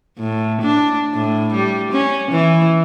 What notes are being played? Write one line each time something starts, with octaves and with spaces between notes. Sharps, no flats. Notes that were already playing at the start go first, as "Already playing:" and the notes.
A2
D4
A2
G3
C#4
E3